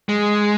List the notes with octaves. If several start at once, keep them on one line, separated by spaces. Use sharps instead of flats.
G#3